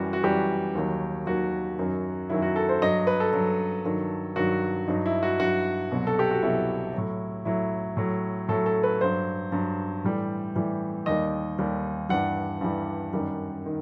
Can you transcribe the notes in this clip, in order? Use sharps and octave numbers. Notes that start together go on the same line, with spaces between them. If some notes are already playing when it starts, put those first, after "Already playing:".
Already playing: F#2 E3 G3 F#4
F#4
F#2 E3 G3 G4
D#2 D#3 F#3
D#2 D#3 F#3 F#4
F#2 D#3 F#3
F#2 D#3 F#3 E4
F#4
A4
C5
G2 F#3 D#5
B4
A4
G2 F#3
G2 D#3 F#3
G2 D#3 F#3 F#4
G2 F#3 D#4
E4
F#4
G2 F#3 F#4
C2 B2 F#3
A4
G4
F#4
C2 B2 F#3 E4
A2 F#3
A2 F#3 E4
A2 F#3
A2 F#3 A4
A4
B4
G2 F#3 C5
G2 F#3
A2 E3 G3
A2 E3 G3
D#2 D#3 G3 D#5
D#2 D#3 G3
G2 E3 G3 F#5
G2 E3 G3
F#2 D#3 G3
D#3